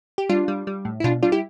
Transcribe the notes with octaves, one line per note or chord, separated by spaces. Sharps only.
G4
G3 D4 F4
G3
G3
A2
E4
B2 D4 F4
G3 D4 F4
E4 G4